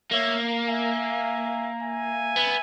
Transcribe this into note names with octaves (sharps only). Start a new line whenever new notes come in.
A#3 C#5 E5
E5 G#5
E5 G#5
B3